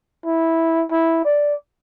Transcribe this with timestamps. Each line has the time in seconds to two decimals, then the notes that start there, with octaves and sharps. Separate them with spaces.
0.26 E4
0.91 E4
1.25 D5